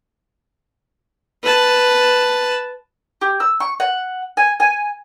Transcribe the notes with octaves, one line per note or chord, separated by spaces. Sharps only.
B4 A5
G4
E6
C#6
F#5
G#5
G#5